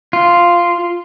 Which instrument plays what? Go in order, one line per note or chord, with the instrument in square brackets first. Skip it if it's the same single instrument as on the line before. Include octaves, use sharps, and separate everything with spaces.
[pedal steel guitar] F4